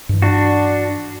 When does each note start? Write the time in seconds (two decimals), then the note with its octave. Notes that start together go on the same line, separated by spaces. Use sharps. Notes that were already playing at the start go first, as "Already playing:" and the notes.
0.09 G2 E3
0.22 D4 F#4